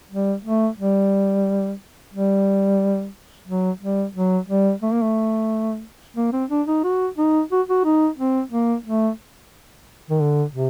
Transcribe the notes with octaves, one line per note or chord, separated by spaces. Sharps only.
G3
A3
G3
G3
F#3
G3
F#3
G3
A3
A#3
A3
A#3
C4
D4
D#4
F#4
D#4
F#4
F#4
D#4
C4
A#3
A3
D#3
D3
C3